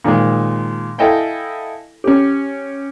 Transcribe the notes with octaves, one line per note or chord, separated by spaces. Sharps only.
A#2 D#3 F3 G#3
E4 A4 D#5 F5 G5 G#5
C#4 G4